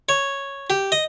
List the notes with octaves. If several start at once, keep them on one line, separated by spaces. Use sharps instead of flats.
C#5
G4
D#5